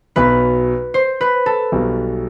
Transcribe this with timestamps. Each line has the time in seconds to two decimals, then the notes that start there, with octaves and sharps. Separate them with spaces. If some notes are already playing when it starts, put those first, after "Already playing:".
0.16 B1 B2 F#3 B3 B4
0.94 C5
1.21 B4
1.46 A4
1.72 B1 B2 G3